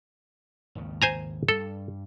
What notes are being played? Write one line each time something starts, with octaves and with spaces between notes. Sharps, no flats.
G#1 D#2 C#3
C5 G#5 A#5
G2 G3 A4